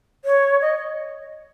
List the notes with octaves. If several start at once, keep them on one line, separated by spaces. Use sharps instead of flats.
C#5
D#5